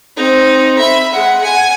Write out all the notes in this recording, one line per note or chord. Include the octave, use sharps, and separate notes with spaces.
C4 D#4
E5 B5
G#3 F#5
F#5 G#5